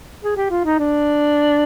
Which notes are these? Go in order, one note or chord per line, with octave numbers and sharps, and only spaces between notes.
G#4
G4
F4
D#4
D4